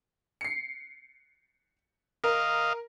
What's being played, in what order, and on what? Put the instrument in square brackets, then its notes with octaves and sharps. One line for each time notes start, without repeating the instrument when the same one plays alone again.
[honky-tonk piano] C7 C#7
[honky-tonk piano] A#4 [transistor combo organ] D#5 F5